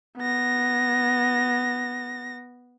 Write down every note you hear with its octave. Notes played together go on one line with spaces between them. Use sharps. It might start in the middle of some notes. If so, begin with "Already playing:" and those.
B3 A#6